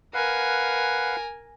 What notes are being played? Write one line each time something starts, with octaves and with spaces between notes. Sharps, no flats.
A#4 B4 F5 F#5 G#5